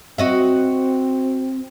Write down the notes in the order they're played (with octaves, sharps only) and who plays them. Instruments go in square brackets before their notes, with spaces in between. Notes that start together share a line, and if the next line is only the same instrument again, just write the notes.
[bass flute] C4 [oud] F#4 D#5 E5